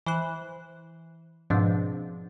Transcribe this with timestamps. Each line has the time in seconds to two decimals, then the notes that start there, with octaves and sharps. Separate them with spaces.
0.06 E3 C5 F#6
1.50 G#2 B2 F3 C4 D4